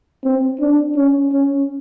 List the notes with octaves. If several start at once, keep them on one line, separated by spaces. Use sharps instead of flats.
C4
D4
C#4
C#4